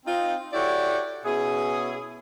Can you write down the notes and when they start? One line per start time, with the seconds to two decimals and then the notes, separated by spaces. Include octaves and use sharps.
0.06 C4 D#4 F4
0.53 E4 F#4 G4 A4 C#5 D5
1.25 B2 C#4 E4 G#4